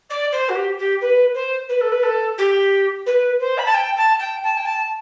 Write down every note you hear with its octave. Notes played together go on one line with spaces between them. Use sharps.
D5
C5
F#4
G4
G4
B4
C5
B4
A4
B4
A4
G4
B4
C5
B5
A5
G5
A5
G5
A5
G5
A5